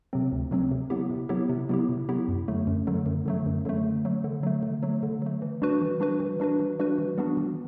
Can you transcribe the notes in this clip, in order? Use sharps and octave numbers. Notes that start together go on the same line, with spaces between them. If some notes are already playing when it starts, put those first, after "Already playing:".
C3 F#3 C4
D2
C3 F#3 C4
C3
F#3 B3 E4 G4
C3
F#3 B3 E4 G4
C3
F#3 B3 E4 G4
C3
F#3 B3 E4 G4
F#2
D3 F#3 A3
F#2
D3 F#3 A3
F#2
D3 F#3 A3
F#2
D3 F#3 A3
D3
F#3 A3
D3
F#3 A3
D3
F#3 A3
D3
F#3 A3
E3
G3 D4 F#4 B4
E3
G3 D4 F#4 B4
E3
G3 D4 F#4 B4
E3
G3 D4 F#4 B4
E3
G3 B3 D4 F#4
E3